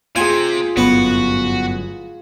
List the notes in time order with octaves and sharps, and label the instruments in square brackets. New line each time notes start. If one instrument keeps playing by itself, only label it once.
[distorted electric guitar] C3 [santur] F4 G#4 [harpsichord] G#5
[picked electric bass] G1 F#2 A2 [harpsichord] B3 [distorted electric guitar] F#4